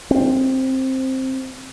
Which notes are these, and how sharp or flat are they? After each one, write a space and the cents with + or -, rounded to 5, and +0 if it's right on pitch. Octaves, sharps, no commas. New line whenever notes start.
C4 +10